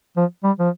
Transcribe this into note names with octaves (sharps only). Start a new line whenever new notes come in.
F3
G3
F3